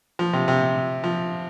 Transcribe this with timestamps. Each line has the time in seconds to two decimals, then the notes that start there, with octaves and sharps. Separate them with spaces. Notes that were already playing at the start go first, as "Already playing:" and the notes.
0.19 F3
0.33 C3
0.48 C3
1.04 F3